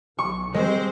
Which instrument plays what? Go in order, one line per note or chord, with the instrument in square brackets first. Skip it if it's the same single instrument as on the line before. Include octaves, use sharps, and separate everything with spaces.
[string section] B1 [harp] C#6
[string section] G3 C4 C5 [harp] G#3